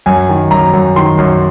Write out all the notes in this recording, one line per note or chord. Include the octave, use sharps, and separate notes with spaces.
F#2 G#5
D#3
F#2 A#5
F#2
D#3 C6
F#2